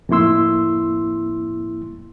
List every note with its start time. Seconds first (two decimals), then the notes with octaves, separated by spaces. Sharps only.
0.09 F2 A2 A#3 E4 C6 E6